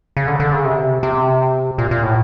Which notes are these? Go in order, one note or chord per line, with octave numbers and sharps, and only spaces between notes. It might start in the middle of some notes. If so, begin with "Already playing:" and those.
C#3
D3
D3
C#3
C3
C3
A#2
A#2
A2